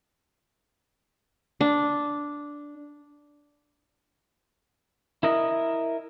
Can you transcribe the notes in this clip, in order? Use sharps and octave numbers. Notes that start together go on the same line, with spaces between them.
D4
E4 A#4 D#5